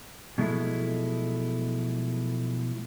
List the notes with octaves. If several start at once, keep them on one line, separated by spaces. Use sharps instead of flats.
B2 F3 F#3 G#3 A3 E4